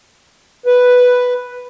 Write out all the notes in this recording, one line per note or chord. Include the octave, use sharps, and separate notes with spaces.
B4